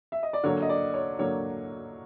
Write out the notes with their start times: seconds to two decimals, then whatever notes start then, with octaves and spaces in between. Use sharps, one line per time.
0.12 E5
0.23 D#5
0.33 D5
0.44 D3 F#3 A#3 C#5
0.62 D#5
0.69 D5
0.94 C#5
1.19 D3 F#3 A#3 C#5